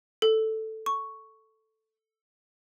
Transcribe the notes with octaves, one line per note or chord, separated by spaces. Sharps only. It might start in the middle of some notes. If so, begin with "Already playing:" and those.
A4
C#6